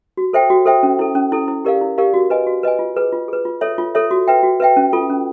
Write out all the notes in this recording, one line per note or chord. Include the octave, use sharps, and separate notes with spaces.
F#4
A4 C5 E5 G5
F#4
A4 C5 E5 G5
C#4
E4 A4
C#4
E4 A4
E4
G4 A#4 D5 F5
E4
G4 A#4 D5 F5
F#4
B4 D#5 G#5
F#4
B4 D#5 G#5
F4
G#4 B4
F4
G#4 B4
F4
A4 C#5 E5
F4
A4 C#5 E5
F#4
B4 E5 G5
F#4
B4 E5 G5
C#4
F4 A4
C#4